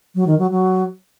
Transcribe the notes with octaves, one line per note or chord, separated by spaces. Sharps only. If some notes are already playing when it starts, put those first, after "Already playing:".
F#3
D#3
F#3
F#3